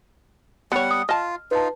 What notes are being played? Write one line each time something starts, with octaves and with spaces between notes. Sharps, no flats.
G3 B3 C#5 F#5
D#6
F4 D#5 A5 F6
D#4 F4 B4 A5